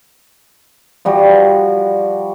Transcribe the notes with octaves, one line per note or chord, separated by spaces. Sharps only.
F3 G3 F#4